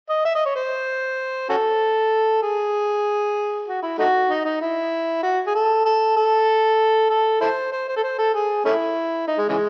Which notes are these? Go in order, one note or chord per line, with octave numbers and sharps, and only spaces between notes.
D#5
E5
D#5
C#5
C5
C#4 F#4 A4
G#4
F#4
E4
A3 D#4 F#4
D#4
D#4
E4
F#4
G#4
A4
A4
A4
A4
E4 A4 C5
C5
C5
A4
C5
A4
G#4
A3 C#4 E4
D#4
G#3
C#3 E3 G#3